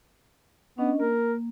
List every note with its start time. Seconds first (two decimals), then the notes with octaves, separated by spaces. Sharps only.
0.78 B3 C#4 D4 D#5
1.00 A#3 A#4